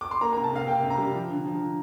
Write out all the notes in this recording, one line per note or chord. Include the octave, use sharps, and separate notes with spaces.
D6
C6
A#3 A#5
C3 A#5
A5
C3 F5
A#3 G5
C3
A#5
G3
F3
D3
F3
D3